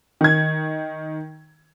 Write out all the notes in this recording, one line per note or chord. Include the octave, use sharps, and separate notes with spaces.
D#3 G#6